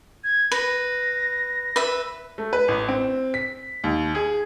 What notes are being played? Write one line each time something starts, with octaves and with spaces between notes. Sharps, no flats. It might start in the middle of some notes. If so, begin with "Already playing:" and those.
G#6
B4 A#6
B4 E5
A3
B4
A1
C4
B6
D#2
G#4